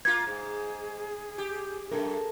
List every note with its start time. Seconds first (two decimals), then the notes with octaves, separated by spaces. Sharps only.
0.05 A#3 F4 G#6
0.27 G#2 G#4
1.38 G4
1.91 F#2 A4 A#4